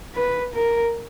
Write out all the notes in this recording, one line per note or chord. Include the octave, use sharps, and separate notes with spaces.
B4
A#4